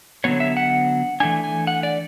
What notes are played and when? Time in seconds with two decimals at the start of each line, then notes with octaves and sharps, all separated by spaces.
0.24 D3 F#3 B3 C#5
0.40 E5
0.57 F#5
1.20 E3 A3 D4 G#5
1.44 G#5
1.67 F#5
1.83 D5